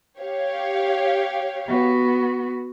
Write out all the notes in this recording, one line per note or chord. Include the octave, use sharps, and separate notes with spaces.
G4 C#5 F5
B3 F#4